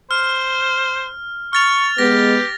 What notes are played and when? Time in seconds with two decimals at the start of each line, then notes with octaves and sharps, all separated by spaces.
0.11 C5 F6
1.53 C#6 F6 A6 F7
1.98 G#3 B3 G4 A#6